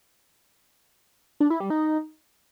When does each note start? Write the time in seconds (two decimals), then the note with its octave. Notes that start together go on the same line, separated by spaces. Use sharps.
1.40 D4
1.50 E4
1.60 G3
1.70 D#4